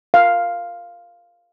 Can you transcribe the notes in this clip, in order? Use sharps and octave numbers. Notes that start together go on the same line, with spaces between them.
F5